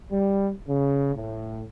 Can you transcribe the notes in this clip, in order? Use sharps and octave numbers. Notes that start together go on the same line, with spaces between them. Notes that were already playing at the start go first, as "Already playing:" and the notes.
G3
C#3
A2